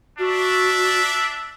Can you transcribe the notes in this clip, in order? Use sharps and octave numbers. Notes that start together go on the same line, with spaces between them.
D4 F#4 D5 E5